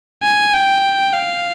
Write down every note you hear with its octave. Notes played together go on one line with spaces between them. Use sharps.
G#5
G5
F5